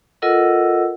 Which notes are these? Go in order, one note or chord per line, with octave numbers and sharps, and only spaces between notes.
F4 A4 A#4 D#5 F#5 E6